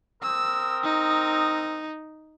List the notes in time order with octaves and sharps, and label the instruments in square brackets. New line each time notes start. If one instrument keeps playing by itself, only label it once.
[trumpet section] C4 A#4 D#6 [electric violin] E6
[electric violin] D#4